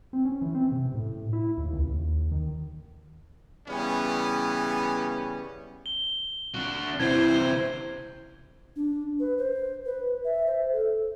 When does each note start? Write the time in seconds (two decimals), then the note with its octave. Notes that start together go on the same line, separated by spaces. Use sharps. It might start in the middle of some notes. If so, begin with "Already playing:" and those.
0.13 C4
0.25 C#4
0.42 E3
0.55 C4
0.72 C3
0.95 A2
1.33 E4
1.58 D#2
1.72 C#2
1.88 D#2
2.31 D#3
3.68 C#3 E3 G3 B3 C#4
5.86 G7
6.54 D4 F#4
7.00 C3 E3 E4 C5 G#6
8.76 D4
9.20 B4
9.38 C5
9.85 B4
10.25 E5
10.47 C5
10.73 A4